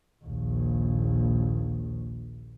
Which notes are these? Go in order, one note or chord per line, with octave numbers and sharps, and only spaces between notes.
A#1 D#2